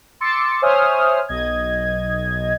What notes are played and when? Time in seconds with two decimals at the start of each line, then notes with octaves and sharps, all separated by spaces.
0.21 C6 D6 E6 A6 C#7
0.62 C5 C#5 E5 G#5 D#6 F6
1.28 B1 D#5 G#6